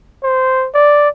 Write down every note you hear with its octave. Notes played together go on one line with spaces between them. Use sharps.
C5
D5